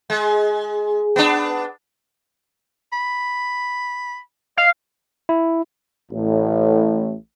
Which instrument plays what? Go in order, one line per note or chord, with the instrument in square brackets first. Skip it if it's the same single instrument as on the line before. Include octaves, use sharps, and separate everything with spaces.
[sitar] G#3
B3 D4
[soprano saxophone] B5
[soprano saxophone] D#5 [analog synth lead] F5
[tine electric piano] E4
[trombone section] A1 A2